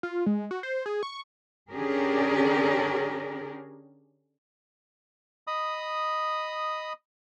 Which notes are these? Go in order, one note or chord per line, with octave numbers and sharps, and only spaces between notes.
F4
G#3
F#4
C5
G#4
C#6
D3 C#4 D4 G4 G#4 A#4
D#5 B5 D#6